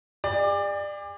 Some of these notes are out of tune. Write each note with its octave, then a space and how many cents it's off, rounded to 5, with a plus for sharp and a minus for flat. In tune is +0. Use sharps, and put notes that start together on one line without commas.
G#4 -45 D5 +20